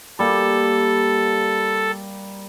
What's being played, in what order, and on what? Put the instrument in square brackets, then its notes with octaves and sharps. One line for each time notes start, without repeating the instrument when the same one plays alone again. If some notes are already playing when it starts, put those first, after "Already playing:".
[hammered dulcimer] G3 A#3 [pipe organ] A4